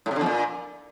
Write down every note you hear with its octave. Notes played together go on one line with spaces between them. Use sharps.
A2
C3
D3
E2
A#2